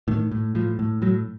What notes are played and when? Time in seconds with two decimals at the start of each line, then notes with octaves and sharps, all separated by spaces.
0.08 A2 D#3
0.31 A2
0.55 A2 F3
0.79 A2
1.02 A2 F#3